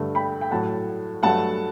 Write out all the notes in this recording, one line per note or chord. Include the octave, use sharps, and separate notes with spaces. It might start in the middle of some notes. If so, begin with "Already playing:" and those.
Already playing: G2 D3 A3
G5 B5
G5
A2 F#3 A3 F#5 A5
G2 F#3 A3 F#5 A5